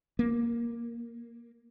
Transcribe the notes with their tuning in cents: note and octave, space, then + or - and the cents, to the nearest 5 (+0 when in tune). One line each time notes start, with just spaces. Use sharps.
A#3 +10